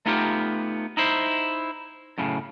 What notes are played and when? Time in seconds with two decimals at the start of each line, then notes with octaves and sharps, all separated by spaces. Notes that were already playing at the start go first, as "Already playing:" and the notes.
0.06 A3 B3 D#4 F4 G4
0.97 D#4 E4 C5
2.18 F#2 A2 C#3